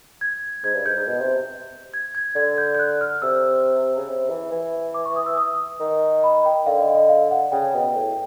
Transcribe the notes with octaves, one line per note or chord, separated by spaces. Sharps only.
G#6
G#2 G#6
G2
G#2 G6
G#2
B2
C3
G#6
G#6
D3 G#6
G6
G6
F#6
F6
C3 E6
C#3
C3
E3
E3
D6
C#6
D#6
E6
D#6
D#3
B5
G5
D3 F5
D#5
D#5
F5
F#5
C#3 G5
B2
A2